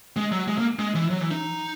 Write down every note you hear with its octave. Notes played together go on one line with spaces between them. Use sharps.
G#3
F#3
G#3
A#3
G#3
E3
F#3
E3
D#4